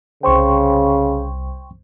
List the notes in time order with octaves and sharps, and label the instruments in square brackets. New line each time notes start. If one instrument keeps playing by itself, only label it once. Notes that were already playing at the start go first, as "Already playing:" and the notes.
[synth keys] C2 C5 [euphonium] C#3 [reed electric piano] G5 C6 C#6